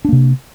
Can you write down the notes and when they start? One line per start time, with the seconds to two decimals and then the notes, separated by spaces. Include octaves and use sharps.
0.05 D4
0.09 A#3
0.12 C3